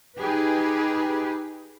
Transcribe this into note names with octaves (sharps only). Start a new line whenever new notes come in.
D#4 G4 G#4 B4